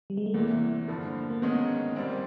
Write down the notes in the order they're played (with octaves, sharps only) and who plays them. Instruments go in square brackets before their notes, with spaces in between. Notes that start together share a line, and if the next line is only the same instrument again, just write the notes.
[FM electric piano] G3
G#3
A3
[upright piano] E2 C3 E3 [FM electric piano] A#3
[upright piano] G2 D3 F3
[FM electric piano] A#3
[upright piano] G#2 D#3 G#3 C#4 [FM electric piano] B3
[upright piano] A#2 G3 C4